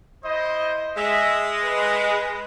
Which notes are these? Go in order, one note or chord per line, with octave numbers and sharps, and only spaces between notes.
E4 C5 D#5
G#3 E5
B4